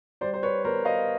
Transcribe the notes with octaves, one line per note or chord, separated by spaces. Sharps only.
G3 C5 D5
C5
B4 C#5
B3 A#4 C5
D#5 F5